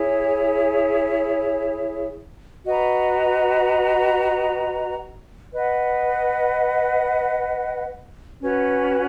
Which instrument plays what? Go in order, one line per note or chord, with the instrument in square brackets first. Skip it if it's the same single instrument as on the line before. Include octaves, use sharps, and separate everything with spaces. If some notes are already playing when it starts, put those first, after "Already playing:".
Already playing: [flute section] E4 G#4 C#5
F#4 B4 D#5 A#5
B4 D#5 F#5
C#4 F#4 B4